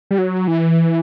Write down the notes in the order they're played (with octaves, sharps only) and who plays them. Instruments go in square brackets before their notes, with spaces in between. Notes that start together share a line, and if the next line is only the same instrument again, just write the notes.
[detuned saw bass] G3
F#3
E3